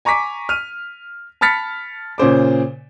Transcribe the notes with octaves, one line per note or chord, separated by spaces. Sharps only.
G#5 A#5 C#6 D6 B6
F6 D#7
A5 B5 F6 A6 B6 C#7
A#2 C#3 C5 D6